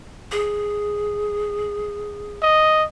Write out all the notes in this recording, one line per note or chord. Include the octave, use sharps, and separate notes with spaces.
G#4
D#5